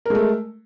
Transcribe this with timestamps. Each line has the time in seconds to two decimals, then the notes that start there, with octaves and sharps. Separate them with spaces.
0.06 A#4
0.10 G#3
0.15 A3